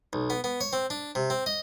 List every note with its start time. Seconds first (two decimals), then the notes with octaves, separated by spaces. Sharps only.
0.13 B1
0.30 B3
0.44 B3
0.61 C#5
0.73 C4
0.90 D4
1.15 C3
1.30 C4
1.46 D#5